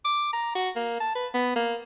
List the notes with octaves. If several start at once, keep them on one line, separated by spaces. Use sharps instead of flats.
D6
A#5
F#4
A#3
A5
B4
B3
A#3